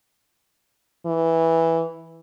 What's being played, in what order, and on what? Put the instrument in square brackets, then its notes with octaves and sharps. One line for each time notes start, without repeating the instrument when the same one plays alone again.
[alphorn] E3